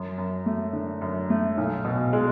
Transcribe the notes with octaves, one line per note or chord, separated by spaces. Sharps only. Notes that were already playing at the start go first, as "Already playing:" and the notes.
Already playing: F#2
F#2
A3
D3
F#2
A3
B1
B2
G#3